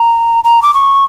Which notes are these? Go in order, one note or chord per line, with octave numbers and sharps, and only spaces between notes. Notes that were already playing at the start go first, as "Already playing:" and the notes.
Already playing: A#5
A#5
D6
C#6